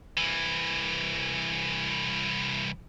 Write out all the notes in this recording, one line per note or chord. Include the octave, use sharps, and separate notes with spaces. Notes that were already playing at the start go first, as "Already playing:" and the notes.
C2 E3